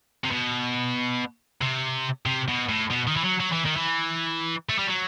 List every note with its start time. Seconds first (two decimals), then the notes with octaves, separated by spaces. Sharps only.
0.24 C3
0.31 B2
1.61 C3
2.26 C3
2.49 B2
2.69 A2
2.91 B2
3.07 D#3
3.16 E3
3.24 F#3
3.40 F#3
3.52 E3
3.65 D#3
3.76 E3
4.69 A3
4.79 G3
4.87 F#3